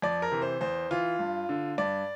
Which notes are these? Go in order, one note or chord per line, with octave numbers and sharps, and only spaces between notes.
F2 D5
A#4
C3 E3
C5
E2 C5
E3 F4
G2
D3
G2 D5